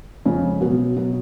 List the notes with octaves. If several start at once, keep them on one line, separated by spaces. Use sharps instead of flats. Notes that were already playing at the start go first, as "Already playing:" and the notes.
F2 C#3 F3 G#3
B2 F#3 B3
B2 F#3 B3